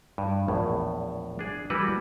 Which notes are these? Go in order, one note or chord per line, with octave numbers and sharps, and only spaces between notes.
G2
A#1 E2 A2
D4 G#4
E3 G3 E4 F#4 A#4 B4